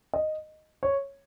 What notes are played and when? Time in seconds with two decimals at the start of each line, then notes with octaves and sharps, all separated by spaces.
0.14 D#5
0.83 C#5